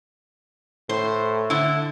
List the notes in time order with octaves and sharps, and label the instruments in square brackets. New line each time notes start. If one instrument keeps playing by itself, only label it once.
[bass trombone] A2 [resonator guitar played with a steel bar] C5
[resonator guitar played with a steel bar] D3 E4